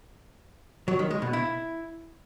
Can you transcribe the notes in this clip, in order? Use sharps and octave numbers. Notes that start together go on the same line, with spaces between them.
F#3
D#3
G#3
B2
E4